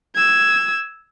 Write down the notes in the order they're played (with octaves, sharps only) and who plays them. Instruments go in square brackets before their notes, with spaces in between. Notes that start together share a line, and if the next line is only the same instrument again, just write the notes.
[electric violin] E6 G#6